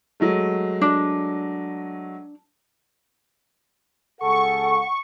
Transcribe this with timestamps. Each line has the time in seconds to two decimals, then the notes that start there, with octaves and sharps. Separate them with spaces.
0.20 F#3 G#3 A3
0.81 D4
4.21 C#2 G#4 A4 F#5 C#6